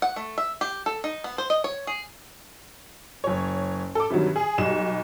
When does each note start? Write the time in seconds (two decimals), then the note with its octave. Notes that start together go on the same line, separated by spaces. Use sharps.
0.02 F#5
0.16 A3
0.38 E5
0.61 G4
0.86 A4
1.04 D#4
1.24 B3
1.38 C5
1.50 D#5
1.64 C#5
1.87 G#4
3.24 F#1 C#5
3.95 A4 D6
4.10 G2 C3 D#3 F#3
4.36 G#4
4.58 B1 G3 E7